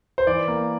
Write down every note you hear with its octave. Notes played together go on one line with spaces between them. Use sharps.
C5
E3 D5
A#3